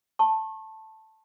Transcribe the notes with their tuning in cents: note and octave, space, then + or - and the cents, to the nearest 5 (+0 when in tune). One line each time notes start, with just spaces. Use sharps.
A5 +0 C#6 -40